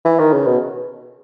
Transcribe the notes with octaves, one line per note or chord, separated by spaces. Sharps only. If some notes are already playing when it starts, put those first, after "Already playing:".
E3
D#3
C#3
B2